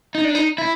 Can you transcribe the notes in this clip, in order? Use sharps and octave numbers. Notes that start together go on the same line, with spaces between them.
D#4
D4
D#4
E4